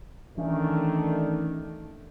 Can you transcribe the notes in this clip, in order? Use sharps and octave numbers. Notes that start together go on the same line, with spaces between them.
D#3 E3 A3 C#4 D4